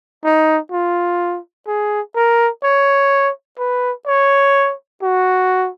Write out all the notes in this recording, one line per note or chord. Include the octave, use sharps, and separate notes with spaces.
D#4
F4
G#4
A#4
C#5
B4
C#5
F#4